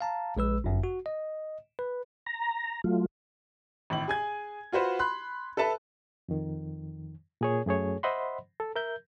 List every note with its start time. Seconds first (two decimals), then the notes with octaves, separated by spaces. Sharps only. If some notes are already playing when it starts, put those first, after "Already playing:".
0.01 F5 A5 A#5
0.37 A#1 G#3 B4 E6
0.64 G1 F#2
0.84 F#4
1.06 D#5
1.79 B4
2.26 A#5
2.84 F#3 A3 F4
3.90 G#1 A2 F#7
4.08 G#4 G#5 G#6
4.72 F4 F#4 B4 C5 F#5
4.99 B5 C6 F#6
5.57 A4 B4 E5 A5
6.28 F2 D#3
7.41 A#2 G#4 C#5
7.66 F#2 A3 G#4 C#5
8.03 C5 D#5 E5 F#5 B5 C6
8.60 A4
8.76 A#4 E5 G6